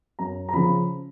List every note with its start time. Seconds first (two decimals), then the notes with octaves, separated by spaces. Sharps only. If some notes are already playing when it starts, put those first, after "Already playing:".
0.19 F#2 A#5
0.49 A#5
0.53 C#3 F3 B5